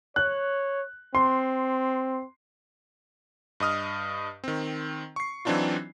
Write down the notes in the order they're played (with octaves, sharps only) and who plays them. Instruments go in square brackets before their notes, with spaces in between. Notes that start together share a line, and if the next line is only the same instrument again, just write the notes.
[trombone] C#5 [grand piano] F#6
[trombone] C4 [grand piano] C6
[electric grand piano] G2 D#5 D#6 F6
D#3 C4
C#6 C7
E3 F#3 C4 D4 D#4 F4